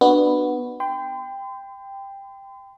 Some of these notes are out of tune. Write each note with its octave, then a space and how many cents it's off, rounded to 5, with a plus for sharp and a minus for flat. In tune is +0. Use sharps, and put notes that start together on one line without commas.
B3 +0 D4 +20 F#4 +0
G5 +10 C6 -40